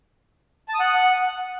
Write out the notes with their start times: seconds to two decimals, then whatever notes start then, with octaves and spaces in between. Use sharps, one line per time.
0.68 A5
0.74 D#6
0.80 F#5